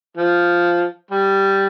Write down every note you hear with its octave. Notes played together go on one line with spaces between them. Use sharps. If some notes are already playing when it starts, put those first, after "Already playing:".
F3
G3